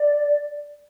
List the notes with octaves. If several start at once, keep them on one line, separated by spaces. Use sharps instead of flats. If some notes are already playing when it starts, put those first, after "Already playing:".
Already playing: D5